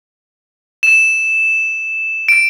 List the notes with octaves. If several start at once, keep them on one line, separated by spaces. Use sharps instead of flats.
E7
D7